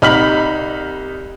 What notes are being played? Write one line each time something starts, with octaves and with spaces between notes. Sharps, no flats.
C2 D#4 B5 F6 B6 F#7